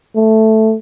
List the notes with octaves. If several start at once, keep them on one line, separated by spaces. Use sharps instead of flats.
A3